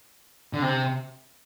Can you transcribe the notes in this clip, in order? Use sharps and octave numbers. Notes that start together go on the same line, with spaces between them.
D3
C3